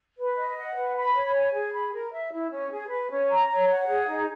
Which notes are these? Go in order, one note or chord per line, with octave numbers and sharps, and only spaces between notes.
B4
D#5
F#5
B4
B5
C#5
G#5
G#4
B5
A#4
E5
E4
C#4
G#4
B4
C#4
A#5
C#5
F#5
G#4
D#4